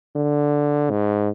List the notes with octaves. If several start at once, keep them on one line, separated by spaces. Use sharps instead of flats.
D3
G#2